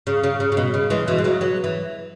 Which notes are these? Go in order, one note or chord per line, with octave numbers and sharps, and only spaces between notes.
C#3
C#3
C#3
C#3
B2
C#3
E3 G#3
B2 E3
G#3
C#3 F#3
F#3 B3
E3